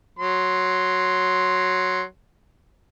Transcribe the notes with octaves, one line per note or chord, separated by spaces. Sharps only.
F#3 C6